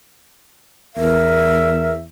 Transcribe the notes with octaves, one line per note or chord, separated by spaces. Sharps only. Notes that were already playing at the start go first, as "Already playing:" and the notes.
E2 A#4 E5